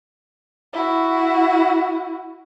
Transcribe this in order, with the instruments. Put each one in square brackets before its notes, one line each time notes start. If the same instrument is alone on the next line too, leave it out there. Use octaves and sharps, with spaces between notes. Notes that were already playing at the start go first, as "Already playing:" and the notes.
[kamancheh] E4 F#4